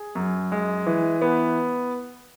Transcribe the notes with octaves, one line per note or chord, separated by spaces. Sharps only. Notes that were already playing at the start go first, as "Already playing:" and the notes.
Already playing: G#4
F#2
G#3
E3
B3